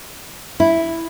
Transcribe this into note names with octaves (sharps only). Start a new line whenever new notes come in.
E4